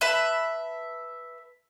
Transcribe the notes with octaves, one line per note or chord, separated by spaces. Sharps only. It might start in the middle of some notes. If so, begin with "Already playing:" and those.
B4 E5 A5 B5